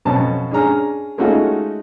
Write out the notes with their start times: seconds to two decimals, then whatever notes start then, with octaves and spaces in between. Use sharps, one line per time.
0.05 F2 B2 C#4 A5
0.51 C#4 D4 G#4 A#5 F6
1.18 G#3 A3 C#4 D#4 F4 F#4